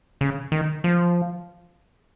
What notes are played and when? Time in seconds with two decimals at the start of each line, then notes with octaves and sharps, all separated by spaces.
0.21 C#3
0.52 D#3
0.84 F3